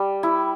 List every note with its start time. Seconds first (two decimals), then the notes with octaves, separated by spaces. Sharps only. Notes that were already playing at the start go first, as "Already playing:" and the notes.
Already playing: G3
0.23 E4